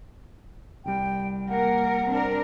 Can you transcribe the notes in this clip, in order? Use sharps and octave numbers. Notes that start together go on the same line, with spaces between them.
C2 G3 G5
A#3 A#4 F#5
C4 D4 A#4